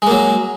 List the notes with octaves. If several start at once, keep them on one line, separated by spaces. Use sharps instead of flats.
F#3 G#3 A#3